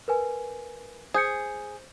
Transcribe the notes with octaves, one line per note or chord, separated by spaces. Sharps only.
A#4 B4 G#5
G#4 C5 G6 C#7